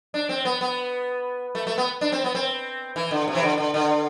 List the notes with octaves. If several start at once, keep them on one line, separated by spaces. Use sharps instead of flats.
D4
C4
B3
B3
A3
A3
B3
D4
C4
B3
C4
E3
D3
C3
E3
D3
D3
D3